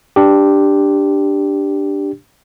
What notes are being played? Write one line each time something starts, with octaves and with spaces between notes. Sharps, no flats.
D4 G4